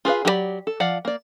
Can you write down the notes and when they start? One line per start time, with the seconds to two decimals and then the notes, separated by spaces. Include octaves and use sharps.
0.05 F4 G#4 B4 F5
0.25 F#3 G4 G#4 D5 B5
0.67 A4
0.80 F3 D5 F5 F#5
1.05 A#3 D5